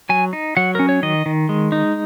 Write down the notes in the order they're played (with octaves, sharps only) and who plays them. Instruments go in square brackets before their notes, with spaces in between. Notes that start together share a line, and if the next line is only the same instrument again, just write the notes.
[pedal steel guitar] F#3 G#5
D#4
F#3 F#5
C#4 A#4
C#5
D#3 D#5
D#3
G#3
D#4